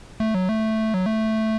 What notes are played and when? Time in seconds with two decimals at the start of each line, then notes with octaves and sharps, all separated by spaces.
0.20 A3
0.34 F#3
0.49 A3
0.94 F#3
1.06 A3